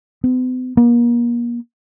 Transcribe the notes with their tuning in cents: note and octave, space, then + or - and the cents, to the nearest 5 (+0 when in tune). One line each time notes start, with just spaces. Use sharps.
B3 +45
A#3 +35